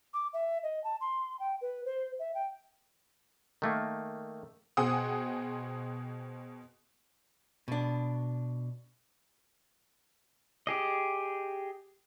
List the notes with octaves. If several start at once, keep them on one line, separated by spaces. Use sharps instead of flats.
D6
E5
D#5
A5
C6
G5
B4
C5
E5
G5
D#3 A3 A#3
B2 G#4 C5 F#5 G5 D#6
B2 D4
G4 G#4 D#5